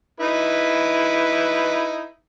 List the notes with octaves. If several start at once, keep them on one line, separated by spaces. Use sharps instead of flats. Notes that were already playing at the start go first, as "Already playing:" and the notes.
D#4 E4 B4